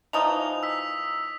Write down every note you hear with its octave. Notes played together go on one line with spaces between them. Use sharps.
E3 F3 D#4 D#6 F7
E6 B6